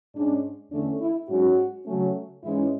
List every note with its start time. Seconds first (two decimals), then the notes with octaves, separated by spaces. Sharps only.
0.15 G#2 G#3 C#4 D4
0.72 E2 D3 A3 C#4 D4
1.01 E4
1.29 G#2 F#3 C#4 F#4
1.86 C#3 F#3 A3 C#4
2.44 G#2 E3 G#3 C#4 E4